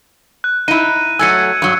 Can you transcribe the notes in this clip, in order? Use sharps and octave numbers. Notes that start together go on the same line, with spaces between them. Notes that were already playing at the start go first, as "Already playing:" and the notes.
F#6
D#4 E4 D#7
F#3 A3 G#5 E6 G#6 C#7
G2 F#3